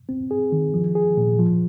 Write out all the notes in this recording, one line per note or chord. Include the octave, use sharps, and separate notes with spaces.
C4
G#4
D#3
F3
G#4
A#2
F3